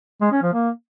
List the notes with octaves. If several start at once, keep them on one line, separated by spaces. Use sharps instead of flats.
G#3
C#4
F3
A#3